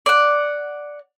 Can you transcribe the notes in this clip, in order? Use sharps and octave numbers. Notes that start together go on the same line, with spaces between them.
D5 F#5